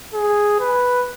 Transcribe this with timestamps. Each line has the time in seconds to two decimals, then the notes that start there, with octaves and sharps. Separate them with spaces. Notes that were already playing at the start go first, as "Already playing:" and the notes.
0.14 G#4
0.60 B4